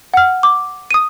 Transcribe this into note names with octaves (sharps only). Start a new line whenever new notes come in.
F#5 F6
D6
D#6 D#7